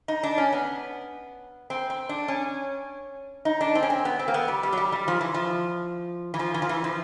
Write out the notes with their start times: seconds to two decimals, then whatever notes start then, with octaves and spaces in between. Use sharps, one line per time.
0.08 D#4
0.23 D4
0.38 C#4
0.52 B3
1.70 C4
1.90 C4
2.09 D4
2.28 C#4
3.45 D#4
3.61 D4
3.75 C4
3.83 C#4
3.90 C4
4.05 B3
4.19 C4
4.28 A#3
4.34 B3
4.48 G3
4.63 G3
4.72 F#3
4.78 G3
4.92 G3
5.08 F3
5.21 E3
5.34 F3
6.34 E3
6.39 F3
6.54 E3
6.62 F3
6.69 E3
6.84 F3